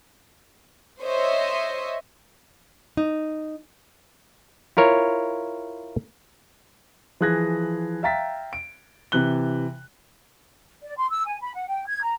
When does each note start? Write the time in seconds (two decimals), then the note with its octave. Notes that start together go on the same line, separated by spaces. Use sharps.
1.03 C5 C#5 D#5 E5
2.97 D#4
4.77 E4 F4 A#4 C#5
7.21 E3 F3 G#4 F#6 G#6 A#6
8.03 E5 F5 G5 A#5 A6 B6
8.53 D7
9.12 C3 E3 F#6 G7
10.83 D5
10.97 C6
11.10 E6
11.27 G#5
11.42 B5
11.55 F#5
11.68 G5
11.87 G#6
12.02 A#5